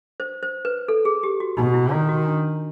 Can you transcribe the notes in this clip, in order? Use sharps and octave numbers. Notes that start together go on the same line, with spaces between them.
C5
C5
B4
A4
G#4
G4
F#4
B2 D#4
E4
D#3 F4
F#4
D4